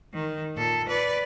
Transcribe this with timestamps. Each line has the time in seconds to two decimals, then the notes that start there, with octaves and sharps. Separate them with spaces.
0.13 D#3
0.56 A#2 A4
0.88 B4 D5